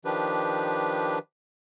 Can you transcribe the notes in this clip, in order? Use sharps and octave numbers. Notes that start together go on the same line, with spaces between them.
D#3 F3 D4 G4 B4